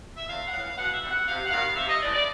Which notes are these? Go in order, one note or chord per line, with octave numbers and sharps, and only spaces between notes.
E5
E2 F5
F#5
C#3 E3 F5
B2 F#5
E5
G3 C4
F#5
C3 F5
F#5
D#3 G3 F5
C3 E5
D#5
E3 A3 D5
D5